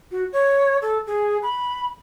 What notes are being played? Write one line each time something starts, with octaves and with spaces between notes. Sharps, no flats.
F#4
C#5
A4
G#4
B5